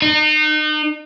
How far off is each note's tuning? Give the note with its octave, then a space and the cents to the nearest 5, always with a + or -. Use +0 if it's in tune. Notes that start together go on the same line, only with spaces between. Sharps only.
D#4 -35